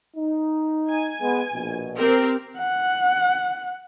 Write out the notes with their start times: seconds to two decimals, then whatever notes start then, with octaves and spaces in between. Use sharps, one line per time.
0.16 D#4
0.91 G#5
1.21 G#3 B3
1.53 A#1 B2
1.98 C4 G4 A#4
2.59 F#5